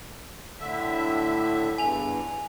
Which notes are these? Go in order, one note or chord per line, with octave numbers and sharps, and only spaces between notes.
A2 D3 E5
E2 G2 G#5 F7